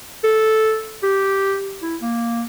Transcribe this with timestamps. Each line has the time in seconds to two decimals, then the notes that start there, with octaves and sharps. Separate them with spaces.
0.24 A4
1.03 G4
1.82 E4
2.02 A#3